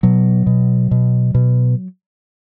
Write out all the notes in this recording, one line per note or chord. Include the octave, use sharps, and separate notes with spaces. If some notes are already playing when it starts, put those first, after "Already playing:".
B2 F#3
B2
B2
B2